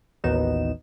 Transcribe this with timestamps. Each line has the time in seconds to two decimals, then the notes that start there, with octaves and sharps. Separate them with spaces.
0.24 A1 D#2 B3 D#4 F#4 E7